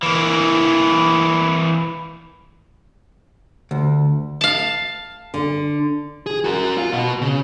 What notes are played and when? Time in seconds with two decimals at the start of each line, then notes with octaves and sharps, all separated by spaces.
0.03 E3 A#3
3.71 D2
4.41 F5 A5
5.34 D3
6.26 G#4
6.44 F#4 A#4
6.78 F4
6.93 B2 F#4
7.22 C#3